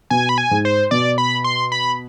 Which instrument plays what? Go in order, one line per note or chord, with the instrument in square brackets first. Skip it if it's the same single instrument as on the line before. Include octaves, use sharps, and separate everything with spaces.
[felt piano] B2 [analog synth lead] G#5
[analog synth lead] B5
G#5
[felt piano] G#2
[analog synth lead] C5
[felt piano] B2 [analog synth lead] D5
[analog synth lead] B5
C6
B5